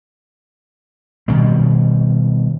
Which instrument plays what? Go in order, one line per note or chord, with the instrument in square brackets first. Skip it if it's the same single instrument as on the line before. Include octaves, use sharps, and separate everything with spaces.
[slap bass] B2 D#3 G3